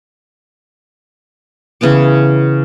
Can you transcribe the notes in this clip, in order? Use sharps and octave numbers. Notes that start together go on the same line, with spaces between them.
C#3 E3 B3 D6